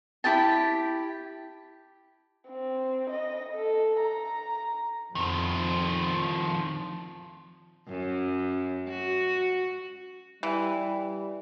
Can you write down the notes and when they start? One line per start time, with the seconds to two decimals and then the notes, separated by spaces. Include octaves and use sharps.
0.24 E4 G4 G5 A5
2.49 C4
3.10 D#5
3.56 A4
4.00 A#5
5.15 F2 D#3 F3
7.88 F#2
8.89 F#4
10.43 E3 G3